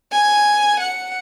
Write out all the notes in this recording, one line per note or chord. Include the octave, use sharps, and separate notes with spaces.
G#5
F#5